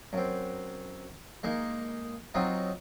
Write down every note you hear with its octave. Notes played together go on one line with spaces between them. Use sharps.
F#2 C4
G#3 A#3 D#4
F#3 C4 D#4 F4